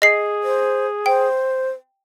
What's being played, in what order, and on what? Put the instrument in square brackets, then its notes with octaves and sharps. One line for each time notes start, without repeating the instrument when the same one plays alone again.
[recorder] G#4 [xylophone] D#5 C7
[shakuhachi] C5
[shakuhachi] C5 [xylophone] G5